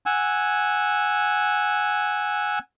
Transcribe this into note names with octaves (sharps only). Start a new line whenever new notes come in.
F#5 G#5 E6